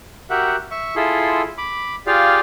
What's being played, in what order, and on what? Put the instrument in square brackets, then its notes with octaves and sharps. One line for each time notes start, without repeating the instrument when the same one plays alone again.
[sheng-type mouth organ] F#4 G4 A#4 E5 F#5
E5 C#6
E4 F4 G#4 A4 C6
B5 D6
F4 G4 G#4 D5 F5